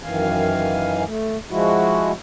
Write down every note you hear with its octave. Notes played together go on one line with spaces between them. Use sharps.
F#2 D#3 E3 F5 G#5
A3
F3 G#3 E4 F#4